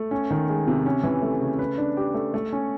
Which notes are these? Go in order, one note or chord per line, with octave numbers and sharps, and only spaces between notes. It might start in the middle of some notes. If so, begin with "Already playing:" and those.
Already playing: A3
C#4
D#3
G#3
C3
C#4
E3
A3
C#3
B4
D4
G4
A3
A3
C#4